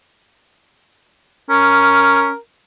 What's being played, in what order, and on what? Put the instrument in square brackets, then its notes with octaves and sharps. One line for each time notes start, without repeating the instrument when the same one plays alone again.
[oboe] C#4 [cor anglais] A#4